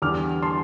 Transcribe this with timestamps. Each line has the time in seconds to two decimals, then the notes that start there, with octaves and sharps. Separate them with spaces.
0.02 E2 D3 G3 D6 F6
0.42 A5 C6